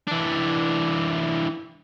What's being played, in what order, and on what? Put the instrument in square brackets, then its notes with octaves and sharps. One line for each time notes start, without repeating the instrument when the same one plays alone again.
[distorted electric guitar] E3 D4